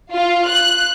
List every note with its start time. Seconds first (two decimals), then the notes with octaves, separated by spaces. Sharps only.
0.13 F4
0.48 F#6